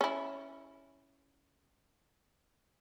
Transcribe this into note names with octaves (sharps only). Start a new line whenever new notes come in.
C#4 E4